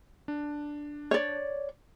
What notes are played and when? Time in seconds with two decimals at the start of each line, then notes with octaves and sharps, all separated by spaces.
0.28 D4
1.11 C#5 D5